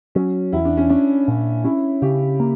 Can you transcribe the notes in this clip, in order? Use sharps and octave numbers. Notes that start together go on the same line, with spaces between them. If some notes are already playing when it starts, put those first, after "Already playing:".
F#3 C#4
E2 E4
D4
C#4
C#4 D4
A#2
C#4 E4
C#3 G4
A#3